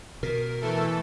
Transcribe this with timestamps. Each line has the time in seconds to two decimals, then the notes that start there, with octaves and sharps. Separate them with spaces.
0.23 B2 A#4
0.61 E3 A3 A4